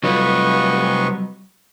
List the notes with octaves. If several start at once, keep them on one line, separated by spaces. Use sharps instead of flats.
C3 F#3 G3 F4 B4 D#5 C#6